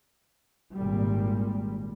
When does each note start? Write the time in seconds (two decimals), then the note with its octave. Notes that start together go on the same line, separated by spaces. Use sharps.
0.75 G#1 A#2 G3